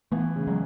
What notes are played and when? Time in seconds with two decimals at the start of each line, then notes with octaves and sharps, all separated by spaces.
0.12 E3 A3 B3
0.36 C#3
0.47 F#3 G#3